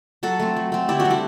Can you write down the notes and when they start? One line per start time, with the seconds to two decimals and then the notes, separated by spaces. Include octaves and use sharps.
0.23 F#3 F#4 A4
0.39 A3 C4
0.56 F#3
0.72 A3 C4
0.88 D3 E4 G4
1.00 D4 F#4
1.05 G3 C4
1.10 E4 G4